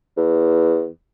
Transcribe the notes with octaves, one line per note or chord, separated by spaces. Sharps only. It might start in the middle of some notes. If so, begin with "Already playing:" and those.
E2